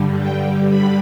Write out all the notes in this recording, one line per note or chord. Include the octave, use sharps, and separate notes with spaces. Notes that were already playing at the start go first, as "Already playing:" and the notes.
Already playing: G2 D3 G3
G5
B5